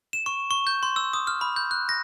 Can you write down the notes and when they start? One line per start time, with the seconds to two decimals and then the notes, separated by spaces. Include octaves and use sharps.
0.13 E7
0.26 C#6
0.51 C#6
0.67 G6
0.83 C6
0.96 E6
1.13 D#6
1.27 F6
1.41 B5
1.56 G6
1.71 F#6
1.89 A#6